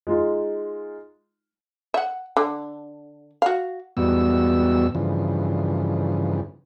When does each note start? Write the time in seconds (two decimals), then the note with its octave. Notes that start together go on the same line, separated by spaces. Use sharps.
0.07 G#3 D#4 F4
1.94 E5 F#5
2.37 D3
3.42 F#4 F5
3.97 E2 G#2 G3 B3 F#4 E6
4.95 G2 C#3 E3 F3